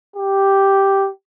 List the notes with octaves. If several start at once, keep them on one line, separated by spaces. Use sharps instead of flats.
G4